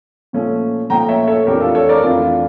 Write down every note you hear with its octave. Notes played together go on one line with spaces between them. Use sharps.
A#2 F3 A3 C#4
A#2 F3 A3 C#4 G5 A#5
C#5 E5
A4 C#5
F2 E3 A3 D4 G4 A#4
F4 A4
A4 C#5
A#4 D5
F2 E3 A3 D4 F4
F4